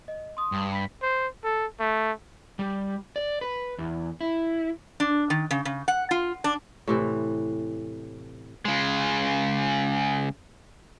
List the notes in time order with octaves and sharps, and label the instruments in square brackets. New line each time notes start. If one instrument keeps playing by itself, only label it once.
[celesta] D#5
C6 D#6
[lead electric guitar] G2
[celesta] B5 B6
[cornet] C5
A4
A3
[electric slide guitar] G3
D5
B4
E2
E4
[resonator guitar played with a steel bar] D4
D#3
C#3
C#3
F#5
F4
D4
[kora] A2 C3 E3
[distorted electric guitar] C#3 G#3